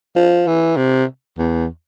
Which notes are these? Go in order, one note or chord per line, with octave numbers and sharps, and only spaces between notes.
F3
E3
C3
E2